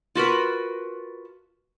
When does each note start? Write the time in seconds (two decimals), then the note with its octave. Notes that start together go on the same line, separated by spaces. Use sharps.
0.15 F4 F#4 A#4 B4